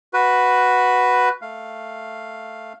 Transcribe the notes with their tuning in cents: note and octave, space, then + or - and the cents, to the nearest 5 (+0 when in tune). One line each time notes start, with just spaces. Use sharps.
F#4 +0 B4 +0
A3 +0 F5 +0